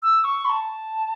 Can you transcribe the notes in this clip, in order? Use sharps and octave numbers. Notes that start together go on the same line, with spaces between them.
E6
C#6
B5
A5